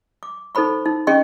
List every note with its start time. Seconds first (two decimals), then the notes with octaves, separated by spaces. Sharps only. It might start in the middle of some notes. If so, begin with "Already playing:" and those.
0.23 D6
0.55 D#4 A4 C5 B5 C#6
0.86 D#4
1.07 C#4 G#4 D#5 G5 C6 C#6